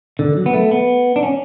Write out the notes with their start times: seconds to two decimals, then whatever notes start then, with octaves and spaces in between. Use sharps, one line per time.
0.19 D3
0.37 F#3
0.46 B3
0.54 A3
0.71 B3
1.16 D4
1.23 C#4